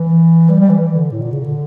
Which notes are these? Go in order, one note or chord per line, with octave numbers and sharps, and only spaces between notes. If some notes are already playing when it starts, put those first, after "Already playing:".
Already playing: E3
G3
G3
E3
E3
D3
A2
A#2
C#3
D3